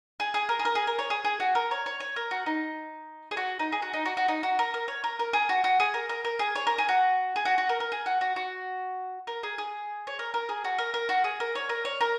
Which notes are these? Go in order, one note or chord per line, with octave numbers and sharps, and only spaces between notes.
G#4
G#4
A#4
G#4
A#4
G#4
A#4
C#5
G#4
G#4
F#4
A#4
C#5
C#5
C#5
A#4
F#4
D#4
G#4
F#4
D#4
G#4
F#4
D#4
F#4
F#4
D#4
F#4
A#4
A#4
C#5
A#4
A#4
G#4
F#4
F#4
G#4
A#4
A#4
A#4
G#4
C#5
A#4
G#4
F#4
G#4
F#4
F#4
A#4
A#4
G#4
F#4
F#4
F#4
A#4
G#4
G#4
C#5
A#4
A#4
G#4
F#4
A#4
A#4
F#4
G#4
A#4
C#5
A#4
C#5
A#4